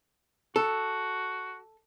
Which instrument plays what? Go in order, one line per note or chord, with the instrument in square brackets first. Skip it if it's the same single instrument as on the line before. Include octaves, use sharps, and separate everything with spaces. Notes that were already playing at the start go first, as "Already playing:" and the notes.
[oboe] F#4 [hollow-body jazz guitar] A4